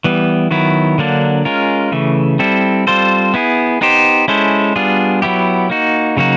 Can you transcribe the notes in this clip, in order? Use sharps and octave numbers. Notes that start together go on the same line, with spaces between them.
E3 G3 B3
D#3 F#3 B3 E4
D3 F#3 A#3 D4
G#3 C#4 F4 A#4
C#3 E3 A3
G3 C4 E4 A4
G3 C4 F4 A4 C5
B3 E4 G#4
B3 D#4 G4 C5
G#3 C#4 E4 A4 C5
G3 B3 D4 F4 G#4
F#3 B3 E4 G4
A#3 D#4 F#4
C#3 F#3 A#3 D#4 F#4